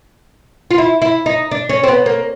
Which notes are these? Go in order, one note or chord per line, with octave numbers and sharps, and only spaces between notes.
F4
E4
E4
D#4
D4
C#4
C4
B3
A#3